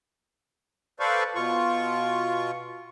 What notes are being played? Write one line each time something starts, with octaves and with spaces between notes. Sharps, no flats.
A4 B4 C5 D5 F5 C#6
B2 F4 C#6